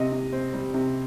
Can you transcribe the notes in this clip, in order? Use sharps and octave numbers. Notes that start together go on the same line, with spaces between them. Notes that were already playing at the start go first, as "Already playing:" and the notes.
Already playing: C3 D#5
C3
C4
G3
C3